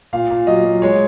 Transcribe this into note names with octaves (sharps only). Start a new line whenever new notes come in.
A#2 F5
A#2
F#3 D#5
F#3
G#3 C#5